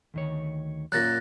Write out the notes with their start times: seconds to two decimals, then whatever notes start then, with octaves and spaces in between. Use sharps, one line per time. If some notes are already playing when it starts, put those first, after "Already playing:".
0.14 D2 D#3 C#5
0.92 F#2 A#2 F#3 F#6 A6 A#6